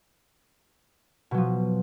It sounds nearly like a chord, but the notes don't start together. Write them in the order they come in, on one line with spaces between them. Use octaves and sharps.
B2 F#3 F3